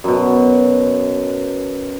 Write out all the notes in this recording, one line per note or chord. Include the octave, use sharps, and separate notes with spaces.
F#2 B2